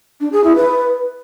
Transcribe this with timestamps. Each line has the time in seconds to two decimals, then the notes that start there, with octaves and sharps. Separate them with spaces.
0.20 D4
0.32 G#4
0.44 E4
0.56 B4